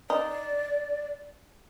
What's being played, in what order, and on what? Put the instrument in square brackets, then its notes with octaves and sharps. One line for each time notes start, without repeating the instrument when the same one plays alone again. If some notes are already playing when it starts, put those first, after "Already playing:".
[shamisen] D#4 [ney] D5